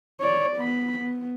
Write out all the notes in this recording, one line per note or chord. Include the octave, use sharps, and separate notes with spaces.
C#5 D5
B3 B5
B3